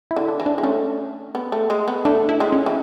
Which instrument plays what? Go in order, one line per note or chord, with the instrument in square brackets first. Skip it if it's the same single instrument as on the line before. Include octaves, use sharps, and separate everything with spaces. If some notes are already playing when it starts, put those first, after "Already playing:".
[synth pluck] E4
[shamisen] D3
[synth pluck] D4
[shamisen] E3
[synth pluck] D4
[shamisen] G#3
[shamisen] A3 [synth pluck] C#4
[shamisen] B3
A3
G#3
B3
[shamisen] A3 [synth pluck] D4
[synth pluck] E4
[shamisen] G#3
[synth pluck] C#4
[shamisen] E3